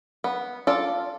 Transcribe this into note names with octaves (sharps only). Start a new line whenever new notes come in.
B3
F4 A4 D5